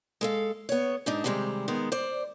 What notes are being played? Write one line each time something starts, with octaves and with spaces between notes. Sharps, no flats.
G#3 A4 F5
B3 C#5
G#2 D4 D#4
C3 D#3 G3 G#3 C4
D#3 G#3 B3
C5 D5